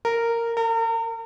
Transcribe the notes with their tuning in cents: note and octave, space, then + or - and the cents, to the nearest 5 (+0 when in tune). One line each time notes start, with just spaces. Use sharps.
A#4 -10
A#4 -40